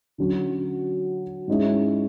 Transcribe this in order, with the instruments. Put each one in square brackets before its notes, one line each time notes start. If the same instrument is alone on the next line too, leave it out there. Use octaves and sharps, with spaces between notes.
[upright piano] D3 F#3 C#4 F#4
G#2 G#3 C#4 E4